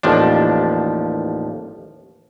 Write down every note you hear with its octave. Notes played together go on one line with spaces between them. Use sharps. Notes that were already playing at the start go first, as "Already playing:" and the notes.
A1 D#2 F3 D4